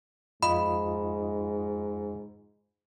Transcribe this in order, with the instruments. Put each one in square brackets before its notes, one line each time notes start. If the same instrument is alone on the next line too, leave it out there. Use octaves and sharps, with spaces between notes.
[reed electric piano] F2 F4 D#5 [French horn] G#2 [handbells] B5